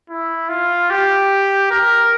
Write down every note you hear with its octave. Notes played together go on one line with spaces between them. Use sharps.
E4
F4
G4
A#4